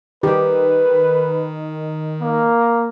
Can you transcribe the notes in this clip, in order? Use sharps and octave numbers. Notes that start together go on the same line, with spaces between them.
D#3 G4 B4
A#3